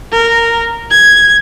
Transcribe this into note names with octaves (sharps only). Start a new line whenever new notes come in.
A#4
G#6